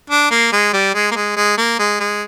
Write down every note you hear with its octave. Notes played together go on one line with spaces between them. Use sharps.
D4
A#3
G#3
G3
G#3
A#3
G#3
G#3
A#3
G#3
G#3